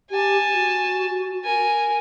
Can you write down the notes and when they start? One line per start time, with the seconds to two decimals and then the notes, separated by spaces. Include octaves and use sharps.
0.10 G4 G#5 A5
0.54 F#4
1.44 A#4 G#5